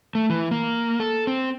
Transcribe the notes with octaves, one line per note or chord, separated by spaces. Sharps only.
A3
E3
A#3
A4
C4